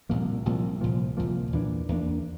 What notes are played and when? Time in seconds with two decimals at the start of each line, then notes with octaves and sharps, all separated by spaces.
0.09 C2 A#2 F3 A#3
0.45 C2 A#2 F3 A#3
0.81 C2 A#2 F3 A#3
1.17 C2 A#2 F3 A#3
1.52 E2 E3 A#3 D4
1.89 E2 E3 A#3 D4